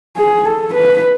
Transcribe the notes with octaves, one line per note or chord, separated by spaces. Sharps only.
G#4
A4
B4